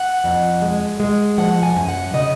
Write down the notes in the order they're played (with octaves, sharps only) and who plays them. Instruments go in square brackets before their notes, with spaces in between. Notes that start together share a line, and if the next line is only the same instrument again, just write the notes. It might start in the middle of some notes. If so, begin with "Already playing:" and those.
Already playing: [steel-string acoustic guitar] F#5
F2
G#3
G#3
F3 F#5
G#5
F#2
F#5
C#3 D#5